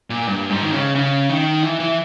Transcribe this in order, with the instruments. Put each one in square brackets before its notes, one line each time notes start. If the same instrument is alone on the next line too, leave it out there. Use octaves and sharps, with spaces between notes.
[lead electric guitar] A#2
G2
G#2
D#3
C#3
C#3
D#3
E3
E3